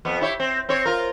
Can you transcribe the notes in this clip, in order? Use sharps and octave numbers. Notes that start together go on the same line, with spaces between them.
F2 B3
E4 G4 C#5
C4
C4 C#5
F4 A#4